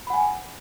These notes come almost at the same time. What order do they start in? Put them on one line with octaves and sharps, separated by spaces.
B5 F#5 G#5